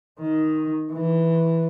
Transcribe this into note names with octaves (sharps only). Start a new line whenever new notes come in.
D#3
E3